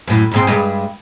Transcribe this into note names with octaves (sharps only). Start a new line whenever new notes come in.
F#2 A2
F2 G#2 C4
G2 G#3